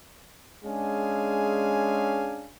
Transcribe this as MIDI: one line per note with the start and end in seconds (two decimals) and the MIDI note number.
0.65 2.51 56
0.65 2.51 61
0.65 2.51 62
0.65 2.51 68
0.65 2.51 77
0.65 2.51 80